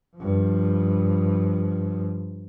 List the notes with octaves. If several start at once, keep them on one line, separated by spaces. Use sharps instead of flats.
G2 F3